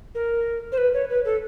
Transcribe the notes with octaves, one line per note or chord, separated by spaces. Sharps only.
A#4
C5
B4
C#5
B4
A4